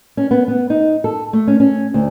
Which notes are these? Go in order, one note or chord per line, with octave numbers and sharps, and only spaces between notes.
C#4
B3
B3
D#4
A4
A3
C#4
C#4
D2